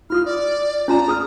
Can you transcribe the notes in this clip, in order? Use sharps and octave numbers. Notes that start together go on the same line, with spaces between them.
E4 F4 D#6 F6
D5
C#4 F4 A5 A#5
G#4 D#6 F6